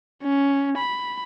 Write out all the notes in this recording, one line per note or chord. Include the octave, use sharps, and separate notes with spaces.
C#4
B5